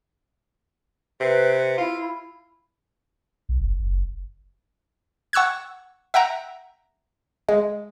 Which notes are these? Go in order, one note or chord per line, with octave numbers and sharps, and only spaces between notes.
C3 B4
E4 F4
B1
F#1
F#1
F#5 C#6 E6 F#6 G#6
E5 F#5 G5 A#5
G#3